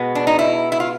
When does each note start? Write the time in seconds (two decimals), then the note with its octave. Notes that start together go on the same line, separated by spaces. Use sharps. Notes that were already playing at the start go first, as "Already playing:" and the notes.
Already playing: B2 G#3 B3
0.15 D4
0.27 D#4
0.39 E4
0.72 E4
0.80 F4